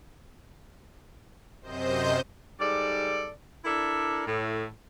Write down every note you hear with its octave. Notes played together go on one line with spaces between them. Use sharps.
F#2 C3 C5 D#5 G6
G#2 G3 A4 D5
D4 E4 A4 A#4 D5 E5
A2